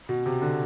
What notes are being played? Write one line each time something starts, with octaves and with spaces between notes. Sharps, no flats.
B2
C3
D3